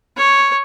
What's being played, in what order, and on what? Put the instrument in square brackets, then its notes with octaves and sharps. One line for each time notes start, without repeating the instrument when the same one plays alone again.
[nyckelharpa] C#5